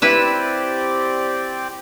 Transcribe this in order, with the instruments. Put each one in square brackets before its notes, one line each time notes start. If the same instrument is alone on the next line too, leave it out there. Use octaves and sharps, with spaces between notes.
[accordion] C4 G4 D5 [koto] E4 B4 E5